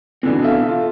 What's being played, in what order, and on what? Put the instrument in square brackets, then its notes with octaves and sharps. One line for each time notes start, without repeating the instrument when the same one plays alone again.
[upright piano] B2 D3 E3 [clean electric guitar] C4
[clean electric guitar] A4 E5 F5
[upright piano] F4